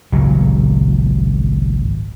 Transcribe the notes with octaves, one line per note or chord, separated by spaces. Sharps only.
G#1 C#2 A#2 F#3